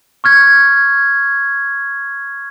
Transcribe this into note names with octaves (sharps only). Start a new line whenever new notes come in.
C#6 F6 G#6